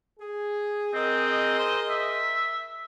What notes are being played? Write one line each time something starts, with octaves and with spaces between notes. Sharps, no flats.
G#4
C4 G#4 A#4 D#5
C5
E5